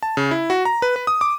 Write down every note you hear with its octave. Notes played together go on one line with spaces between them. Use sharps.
A5
C#3
E4
F#4
A#5
B4
B4
D#6
D6